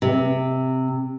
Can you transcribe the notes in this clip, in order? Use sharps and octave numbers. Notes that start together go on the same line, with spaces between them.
C3